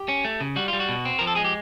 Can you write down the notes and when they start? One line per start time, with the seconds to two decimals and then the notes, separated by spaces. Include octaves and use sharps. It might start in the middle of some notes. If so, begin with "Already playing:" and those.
Already playing: G4
0.08 C#4
0.25 A3
0.40 C#3
0.56 G3 F#4
0.68 G3 F4
0.80 F#4
0.89 B2
1.05 C4
1.19 F3 A#4
1.27 A4
1.35 G#3 G#4
1.44 G4